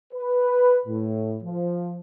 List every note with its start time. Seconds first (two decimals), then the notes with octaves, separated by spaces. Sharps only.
0.13 B4
0.86 A2
1.43 F3